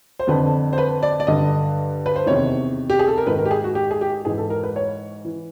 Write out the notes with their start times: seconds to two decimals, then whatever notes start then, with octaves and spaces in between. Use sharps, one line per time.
0.19 C5
0.27 F2 D3 B4
0.73 C5
0.78 B4
1.03 D5
1.20 D5
1.27 G2 D3 D#5
2.06 B4
2.16 C5
2.26 E2 C3 D#3 C#5
2.90 G4
2.99 G#4
3.07 A4
3.18 A#4
3.27 G#2 D#3 B4
3.39 A#4
3.45 G4
3.51 G#4
3.64 F#4
3.75 G4
3.91 G#4
4.01 G4
4.25 G#2 E3 G#4
4.38 A4
4.50 A#4
4.63 B4
4.76 C#5
5.25 E3